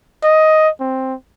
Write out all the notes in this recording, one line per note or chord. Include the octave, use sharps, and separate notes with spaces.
D#5
C4